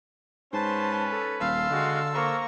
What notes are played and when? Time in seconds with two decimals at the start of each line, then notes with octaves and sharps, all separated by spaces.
0.53 G#2 C#4 B4 C5 A5 C6
1.11 A4
1.40 D#1 F5 A5 C6 E6
1.70 D3 G#3 F#4
2.14 A#3 C5 A#5 C#6